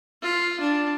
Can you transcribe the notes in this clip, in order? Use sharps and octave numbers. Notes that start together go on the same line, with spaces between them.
F4
D4